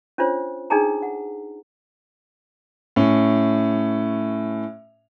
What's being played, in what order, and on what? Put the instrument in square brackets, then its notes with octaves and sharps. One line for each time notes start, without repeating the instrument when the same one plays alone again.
[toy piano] C#4 D4 F4 C5 C#5
D4 D#4 G#4 A4 G5 A#5
F#5
[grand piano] A2 C#4